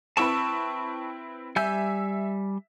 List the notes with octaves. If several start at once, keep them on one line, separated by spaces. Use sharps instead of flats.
C4 E4 B4 A5 C#6 E6
G3 E5 G#5 G6